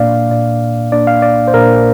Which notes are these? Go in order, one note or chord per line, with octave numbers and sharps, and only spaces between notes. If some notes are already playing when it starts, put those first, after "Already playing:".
Already playing: A#2 A#3 D4 D5 F5
A#2 A#3 D4 D5
A#2 A#3 D4 D5
F5
D5
C5
A#2 A#3 D4 A#4